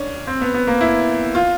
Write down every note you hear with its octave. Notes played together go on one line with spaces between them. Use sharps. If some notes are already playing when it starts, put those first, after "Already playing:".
Already playing: C#4 D4
C4
B3
B3
A#3
E4
F4